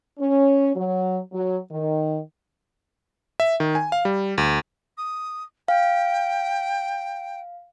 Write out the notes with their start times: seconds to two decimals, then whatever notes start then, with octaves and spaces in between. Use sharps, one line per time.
0.19 C#4
0.75 F#3
1.33 F#3
1.71 D#3
3.40 E5
3.60 D#3
3.75 G#5
3.92 F5
4.05 G3
4.38 D2
4.98 D#6
5.68 F5 G5